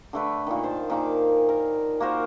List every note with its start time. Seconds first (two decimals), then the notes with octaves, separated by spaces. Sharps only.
0.13 D3 A3 B4
0.47 A#2 D#3
0.64 C5 A5
0.90 A#2 D#3 D6
1.49 A#4
2.00 A#3 F#4 A#4 C5